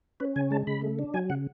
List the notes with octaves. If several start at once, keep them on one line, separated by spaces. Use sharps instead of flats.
C#4 B4
C#3 G#5
G#3 A5
C#3 B5
A3
D4
F#3 G#5
C#3 F#5